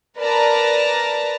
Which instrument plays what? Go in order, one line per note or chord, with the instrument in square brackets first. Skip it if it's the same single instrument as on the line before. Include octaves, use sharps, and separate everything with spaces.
[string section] A#4 B4 D5 A5 A#5